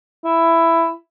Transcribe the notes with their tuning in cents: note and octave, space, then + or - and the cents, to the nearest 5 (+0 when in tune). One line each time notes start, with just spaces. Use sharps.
E4 +10